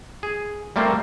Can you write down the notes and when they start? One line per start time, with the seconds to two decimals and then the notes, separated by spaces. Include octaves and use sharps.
0.23 G#4
0.76 G3 A3 A#3 C4 A#4 C5